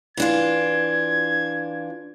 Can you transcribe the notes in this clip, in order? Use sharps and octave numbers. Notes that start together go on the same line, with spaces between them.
E3 D4 F4 G#6